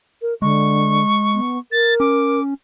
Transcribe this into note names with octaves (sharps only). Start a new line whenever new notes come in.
A#4
D3 G#3 C#6
B3
A#4 A6
C#4 D6